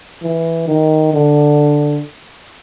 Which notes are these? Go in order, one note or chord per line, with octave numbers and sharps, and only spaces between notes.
E3
D#3
D3